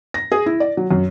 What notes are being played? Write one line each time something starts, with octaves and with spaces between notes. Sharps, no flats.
A#6
G#4
E4
D5
F#3
F#2